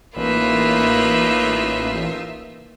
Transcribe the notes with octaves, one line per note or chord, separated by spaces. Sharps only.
A1 A#3 D#4 F4 B4 E5